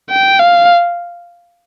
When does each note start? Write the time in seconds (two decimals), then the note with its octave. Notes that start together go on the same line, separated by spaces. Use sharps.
0.11 G5
0.39 F5